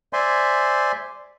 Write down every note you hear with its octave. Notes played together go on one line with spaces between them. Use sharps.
C5 D5 E5 G#5 C6